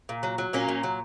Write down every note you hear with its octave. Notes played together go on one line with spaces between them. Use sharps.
A#2
F#3
F#3
A#2 A#3 C#4
A#2
F#3